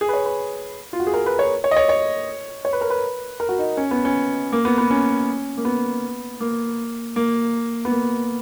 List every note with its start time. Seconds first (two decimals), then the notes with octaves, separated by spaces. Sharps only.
0.01 G#4
0.09 B4
0.13 C#5
0.26 B4
0.93 F4
1.00 F#4
1.07 G#4
1.14 A#4
1.26 B4
1.39 C#5
1.64 C#5
1.71 D#5
1.77 C#5
1.89 C#5
2.65 C#5
2.73 B4
2.81 A#4
2.90 B4
3.40 A#4
3.49 F#4
3.58 D#4
3.77 C#4
3.91 B3
4.05 C#4
4.52 A#3
4.65 B3
4.78 B3
4.90 C#4
5.57 A#3
5.65 B3
6.40 A#3
7.16 A#3
7.85 B3
7.91 A#3